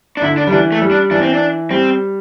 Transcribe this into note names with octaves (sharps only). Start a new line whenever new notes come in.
D4
D3 E4
D4
G3
E3 D4
A3
G3
D4
E3 D4
C4
D4
G3 C4